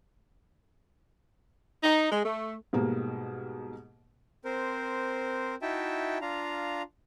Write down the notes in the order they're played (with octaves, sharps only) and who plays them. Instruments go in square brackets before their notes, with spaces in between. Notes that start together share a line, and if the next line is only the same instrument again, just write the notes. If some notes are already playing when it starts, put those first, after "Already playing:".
[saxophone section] D#4
G#3
A3
[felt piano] G#2 B2 G3 A#3
[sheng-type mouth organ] C4 A#4 C5
D#4 E4 F#4 E5 G5 A5
D4 F4 F5 A#5